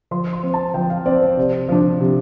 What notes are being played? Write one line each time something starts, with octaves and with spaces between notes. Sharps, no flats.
F3 C6
C6
C4
A5
F3 G5
F5
C4 D5
C5
C3
F3 D4
C3